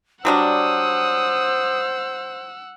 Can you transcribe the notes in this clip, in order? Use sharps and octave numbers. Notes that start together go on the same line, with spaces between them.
F#3 G3 D4 C5 F#5 D#6 E6